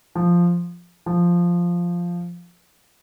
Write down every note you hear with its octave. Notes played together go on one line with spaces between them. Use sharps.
F3
F3